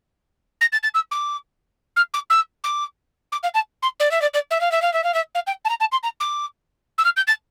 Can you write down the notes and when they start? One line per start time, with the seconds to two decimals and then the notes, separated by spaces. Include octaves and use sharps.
0.61 A#6
0.72 A6
0.83 A6
0.94 E6
1.11 D6
1.96 F6
2.14 D6
2.30 E6
2.64 D6
3.32 D6
3.43 F5
3.54 A5
3.82 C6
4.00 D5
4.11 E5
4.22 D5
4.34 D5
4.51 E5
4.61 F5
4.72 E5
4.82 F5
4.93 E5
5.04 F5
5.14 E5
5.35 F5
5.47 G5
5.65 A5
5.69 A#5
5.80 A5
5.92 C6
6.03 A#5
6.20 D6
6.98 E6
7.05 F6
7.16 G6
7.27 A6